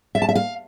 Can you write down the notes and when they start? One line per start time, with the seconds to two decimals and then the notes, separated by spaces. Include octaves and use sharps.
0.15 E5
0.22 A5
0.29 E5
0.35 F5